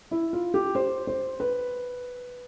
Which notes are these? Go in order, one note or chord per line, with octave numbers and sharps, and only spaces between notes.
E4
F4
G4
C5
C5
B4